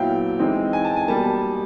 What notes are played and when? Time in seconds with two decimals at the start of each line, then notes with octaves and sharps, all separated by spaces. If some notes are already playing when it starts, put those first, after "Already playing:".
Already playing: A#2 F#3 B3 E4 F5 G5
0.39 E3 G#3 C4 D#4
0.73 G#5
0.85 A5
0.96 G#5
1.08 B2 G3 A#3 A5